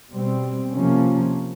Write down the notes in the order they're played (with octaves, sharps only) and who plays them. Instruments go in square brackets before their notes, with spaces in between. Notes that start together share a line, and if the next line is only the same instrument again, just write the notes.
[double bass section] B2 G3 C4
C3 F3 A#3 C#4